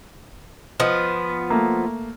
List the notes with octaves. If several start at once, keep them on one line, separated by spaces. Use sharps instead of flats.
F3 B3 D#5
A3 A#3